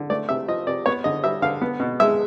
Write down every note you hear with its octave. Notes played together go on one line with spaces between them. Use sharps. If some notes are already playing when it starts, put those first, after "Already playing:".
Already playing: D3
A3 D5
C3 E5
F3 D#5
C3 D5
B3 C#5
D3 D#5
G3 E5
D3 F5
B3
B2
G#3 E5